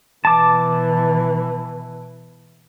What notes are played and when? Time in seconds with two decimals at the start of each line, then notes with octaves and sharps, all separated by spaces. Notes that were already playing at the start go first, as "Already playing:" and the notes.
0.25 B2 E3 A5 D6